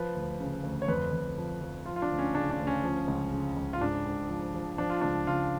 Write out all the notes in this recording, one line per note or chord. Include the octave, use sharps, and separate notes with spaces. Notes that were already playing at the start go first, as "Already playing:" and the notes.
Already playing: F3 B4
D2
C#3
D2
C#5
F2 B4
F2
F3
F3
F3 F4
F4
D4
D2
C#4
C#3 D4
D4
D2
C#4
F3
C#2
C#3
C#2
F4
G#2 D4
G#2
F3
F3
F3 D4
F4
C#2 D4
C#3 F4